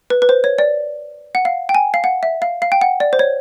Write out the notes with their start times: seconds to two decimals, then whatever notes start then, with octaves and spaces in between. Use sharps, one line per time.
0.10 B4
0.22 B4
0.29 C5
0.44 C#5
0.58 D5
1.35 F#5
1.45 F5
1.69 G5
1.75 G#5
1.94 F5
2.04 F#5
2.23 E5
2.42 F5
2.62 F5
2.72 G5
2.81 F#5
3.00 D5
3.13 C5
3.19 C#5